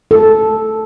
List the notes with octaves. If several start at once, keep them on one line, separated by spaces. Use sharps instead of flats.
A4